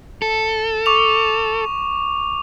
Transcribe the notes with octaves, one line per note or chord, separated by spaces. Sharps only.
A4
C#6 D6 F7